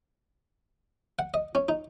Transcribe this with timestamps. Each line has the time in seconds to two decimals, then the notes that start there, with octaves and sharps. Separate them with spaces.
1.19 F#5
1.34 D#5
1.55 C#4
1.69 D#4